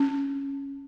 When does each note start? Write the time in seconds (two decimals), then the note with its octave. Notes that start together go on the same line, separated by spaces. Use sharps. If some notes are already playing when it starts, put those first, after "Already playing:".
Already playing: C#4